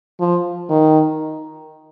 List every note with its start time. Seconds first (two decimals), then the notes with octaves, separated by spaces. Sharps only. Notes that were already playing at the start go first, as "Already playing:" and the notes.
0.20 F3
0.69 D#3